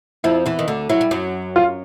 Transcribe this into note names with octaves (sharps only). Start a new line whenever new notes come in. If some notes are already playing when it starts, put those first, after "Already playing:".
F2 F3 E4
E2 E3
D#3
D2 D3
F#3 E4
G3
F#2 F#3
F4